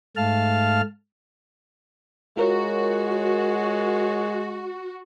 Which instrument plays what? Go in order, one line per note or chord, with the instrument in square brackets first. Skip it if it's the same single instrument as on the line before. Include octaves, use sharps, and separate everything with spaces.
[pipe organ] G#2 A3 F5 A5 F6
[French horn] G#3 [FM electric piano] F4 A#4 C#5 [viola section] F#4